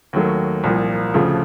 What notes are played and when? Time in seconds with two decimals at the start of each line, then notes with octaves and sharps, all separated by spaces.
0.13 D#2 D#3 F#3 A3
0.64 C2 A#2 F3
1.14 D2 C#3 F3 A3